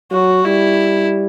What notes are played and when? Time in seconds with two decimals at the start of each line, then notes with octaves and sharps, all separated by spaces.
0.11 F#3 F#4
0.45 G3 E4